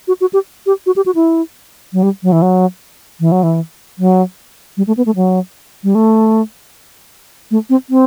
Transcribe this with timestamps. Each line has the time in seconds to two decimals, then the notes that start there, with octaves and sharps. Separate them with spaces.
0.08 F#4
0.21 F#4
0.33 G4
0.66 G4
0.86 F#4
0.96 G4
1.06 F#4
1.15 E4
1.93 F#3
2.03 G3
2.23 F#3
2.32 E3
2.42 F#3
3.20 E3
3.32 F#3
3.43 E3
3.99 F#3
4.77 G3
4.87 A3
4.97 B3
5.06 A3
5.16 F#3
5.84 G3
5.95 A3
7.51 A3
7.70 C4
7.90 C4